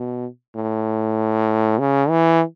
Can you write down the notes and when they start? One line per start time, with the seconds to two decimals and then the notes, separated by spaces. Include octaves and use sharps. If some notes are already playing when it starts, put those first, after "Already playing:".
Already playing: B2
0.56 A2
1.79 C#3
2.10 E3